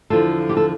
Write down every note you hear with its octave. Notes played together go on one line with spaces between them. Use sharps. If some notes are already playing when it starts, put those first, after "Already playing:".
E2 D3 F3 F4 A4
G4
A4